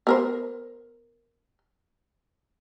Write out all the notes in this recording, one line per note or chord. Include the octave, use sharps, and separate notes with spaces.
B3 A#4 C5